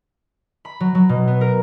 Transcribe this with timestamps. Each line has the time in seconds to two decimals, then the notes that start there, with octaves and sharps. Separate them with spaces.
0.65 B5
0.80 F#3
0.95 F#3
1.09 B2
1.28 B3
1.41 A#4